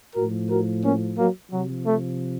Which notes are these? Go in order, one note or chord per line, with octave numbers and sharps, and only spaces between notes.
A2 F3 F#4 A#4
F#4 A#4
A#3 C#4
F#3 A#3
C3 F3 F#3
A3